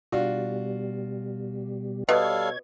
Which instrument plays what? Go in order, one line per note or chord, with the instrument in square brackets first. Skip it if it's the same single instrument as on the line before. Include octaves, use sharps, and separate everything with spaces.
[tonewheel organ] B2 G3 [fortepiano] D4 F4 F#4
[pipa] B2 [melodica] G3 A4 F5 [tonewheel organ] C#5 G#6